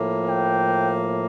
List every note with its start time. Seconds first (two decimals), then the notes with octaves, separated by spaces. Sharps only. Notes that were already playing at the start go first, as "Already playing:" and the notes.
Already playing: A2 F3 A#3
0.29 G5